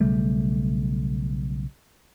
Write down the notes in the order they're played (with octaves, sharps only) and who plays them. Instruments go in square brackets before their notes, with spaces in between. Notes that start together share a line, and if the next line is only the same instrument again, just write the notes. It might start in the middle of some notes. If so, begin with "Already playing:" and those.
[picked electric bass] B1 C#3 G3 A3